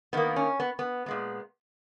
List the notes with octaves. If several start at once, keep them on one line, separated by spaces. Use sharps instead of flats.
D#3 A#3 B3
C#4
B3
B3
A#2 G#3 B3